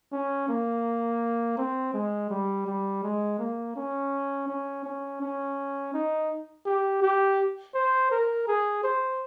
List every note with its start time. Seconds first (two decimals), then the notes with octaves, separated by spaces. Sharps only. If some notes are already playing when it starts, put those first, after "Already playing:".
0.13 C#4
0.49 A#3
1.57 C4
1.94 G#3
2.30 G3
2.67 G3
3.03 G#3
3.39 A#3
3.76 C#4
4.48 C#4
4.84 C#4
5.21 C#4
5.94 D#4
6.66 G4
7.02 G4
7.74 C5
8.11 A#4
8.48 G#4
8.84 C5